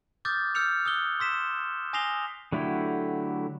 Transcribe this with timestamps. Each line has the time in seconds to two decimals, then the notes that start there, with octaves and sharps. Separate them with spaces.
0.25 D6 D#6 F6 G6 A6
0.55 E6 F6 G6 C#7 F7
0.85 D#6 E6 F#6 G7
1.20 C6 E6 B6 E7
1.93 G#5 D#6 A#6 C7 F7 G7
2.53 D3 F#3 A3 E4 G4